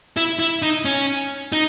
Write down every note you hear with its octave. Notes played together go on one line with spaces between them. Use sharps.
E4
E4
D#4
C#4
D#4